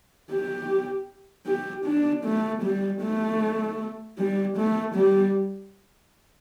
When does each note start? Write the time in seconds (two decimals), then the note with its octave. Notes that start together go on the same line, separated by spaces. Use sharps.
0.31 G4
1.47 G4
1.86 D4
2.25 A3
2.63 G3
3.01 A3
4.18 G3
4.57 A3
4.96 G3